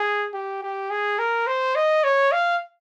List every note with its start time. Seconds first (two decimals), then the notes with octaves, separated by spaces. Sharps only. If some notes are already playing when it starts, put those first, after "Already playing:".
Already playing: G#4
0.34 G4
0.63 G4
0.91 G#4
1.19 A#4
1.47 C5
1.75 D#5
2.04 C#5
2.32 F5